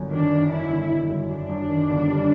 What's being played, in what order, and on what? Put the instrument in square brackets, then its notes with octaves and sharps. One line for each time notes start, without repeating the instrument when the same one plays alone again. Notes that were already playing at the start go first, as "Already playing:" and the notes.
Already playing: [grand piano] G1 F#2
[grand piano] D#3 [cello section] D4
[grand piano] D#3
[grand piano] D#3 [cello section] E4
[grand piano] G1
G1
F#2
[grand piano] F#2 [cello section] D4
[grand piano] F#2
D#3
G1
G3